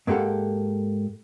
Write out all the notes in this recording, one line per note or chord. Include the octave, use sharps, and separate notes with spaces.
G#2 A#3 B3 G4 A4 F#5